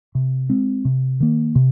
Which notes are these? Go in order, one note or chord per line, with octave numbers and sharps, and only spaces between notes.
C3
G#3 C4
C3
D#3 A#3
C3